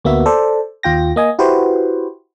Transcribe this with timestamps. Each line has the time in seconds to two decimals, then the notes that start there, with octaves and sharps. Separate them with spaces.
0.04 D2 A#3 B3 F#4 E5
0.26 A4 C5 D5
0.83 D#2 F4 G5 A#6
1.16 A#3 D#5 G#5
1.39 E4 F#4 G4 B4 C5